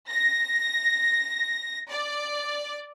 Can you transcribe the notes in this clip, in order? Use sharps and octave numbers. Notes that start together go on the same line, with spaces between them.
A#6
D5